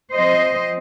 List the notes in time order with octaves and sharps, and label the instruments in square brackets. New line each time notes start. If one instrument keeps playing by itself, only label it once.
[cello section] F3 C4 C5 D#5